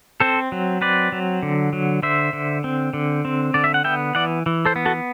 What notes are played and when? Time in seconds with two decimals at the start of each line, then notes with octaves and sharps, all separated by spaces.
0.20 C4 A4 C5
0.52 F#3
0.81 C4 B4 D5
1.12 F#3
1.43 D3
1.73 F#3
2.03 D3 C5 E5
2.33 D3
2.64 C4
2.93 D3
3.25 C4
3.54 D3 D5
3.64 E5
3.74 F#5
3.84 B3 E5 G5
4.15 E3 D5 F#5
4.46 E3
4.65 A4 C5
4.76 B3
4.86 F#4 A4